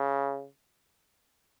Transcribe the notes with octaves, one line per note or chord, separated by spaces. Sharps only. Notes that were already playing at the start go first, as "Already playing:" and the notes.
Already playing: C#3